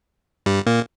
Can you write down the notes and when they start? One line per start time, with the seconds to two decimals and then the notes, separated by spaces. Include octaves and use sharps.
0.46 G2 G3
0.66 A#2 A#3